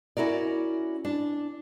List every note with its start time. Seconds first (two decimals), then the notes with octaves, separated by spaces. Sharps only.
0.17 C#4 E4 F#4 A#4 D5
1.05 D4